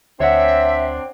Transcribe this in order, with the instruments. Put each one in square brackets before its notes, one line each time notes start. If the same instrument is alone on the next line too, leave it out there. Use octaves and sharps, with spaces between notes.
[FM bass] D2 [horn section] C4 D4 [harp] C#5 F#5 [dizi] E5